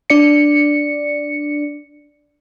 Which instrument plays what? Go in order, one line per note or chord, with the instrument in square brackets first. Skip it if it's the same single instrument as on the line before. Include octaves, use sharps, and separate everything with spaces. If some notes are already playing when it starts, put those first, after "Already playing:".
[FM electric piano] D4 D5 C#7